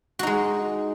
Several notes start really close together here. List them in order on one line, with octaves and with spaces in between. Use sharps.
F#4 D#4 G#3